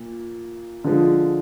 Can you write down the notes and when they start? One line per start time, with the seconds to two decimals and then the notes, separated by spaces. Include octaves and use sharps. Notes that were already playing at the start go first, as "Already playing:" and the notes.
Already playing: A#2
0.84 D3 F3 G#3